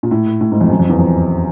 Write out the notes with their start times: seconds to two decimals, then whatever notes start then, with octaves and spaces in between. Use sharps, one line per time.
0.03 A#2
0.11 A2
0.41 A2
0.51 G#2
0.61 F2
0.70 F#2
0.79 F2
0.89 E2
0.99 F2